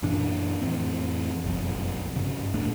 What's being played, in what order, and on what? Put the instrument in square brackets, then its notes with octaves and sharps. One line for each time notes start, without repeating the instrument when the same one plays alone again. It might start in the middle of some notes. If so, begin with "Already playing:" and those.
[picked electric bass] F#2 A#2 E3 D4
F2 A2 E3 C4
F#1 B1 F2
G2 C#3
D#1 A2 A#3 D4